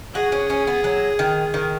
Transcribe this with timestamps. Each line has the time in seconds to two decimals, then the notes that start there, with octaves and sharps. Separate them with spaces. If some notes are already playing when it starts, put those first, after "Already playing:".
0.14 F#4 G#4
0.32 C#4
0.50 C#4
0.67 B3
0.84 F#3
1.19 D#3
1.54 D#3